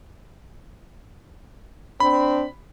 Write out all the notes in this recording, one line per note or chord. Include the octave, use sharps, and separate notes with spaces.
C4 D4 B5